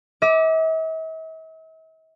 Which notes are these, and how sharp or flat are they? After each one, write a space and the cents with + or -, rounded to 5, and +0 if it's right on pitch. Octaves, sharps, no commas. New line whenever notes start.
E5 -45 D6 +0